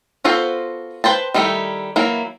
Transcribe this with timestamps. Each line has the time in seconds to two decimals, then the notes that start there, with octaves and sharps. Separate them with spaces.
0.24 B3 F4 F#4 A4 C5
1.04 B4 C5 G5 A5
1.34 D#3 G3 A3 D#4 E4
1.96 E3 F#3 A#3 E4